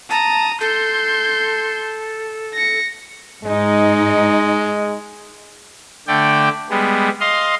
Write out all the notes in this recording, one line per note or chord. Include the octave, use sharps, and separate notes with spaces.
A5 A#5 D#6
A4 C6 G6
A#6 C#7
G#2 G#3 D#4
D3 A3 D5 G5
G3 G#3 B3
D#5 F5 C6